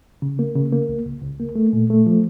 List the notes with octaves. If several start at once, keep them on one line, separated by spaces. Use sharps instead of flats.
C#3
A#3
C#3
A#3
C#2
C#2
C#2
A#3
A3
A#2
A3
F3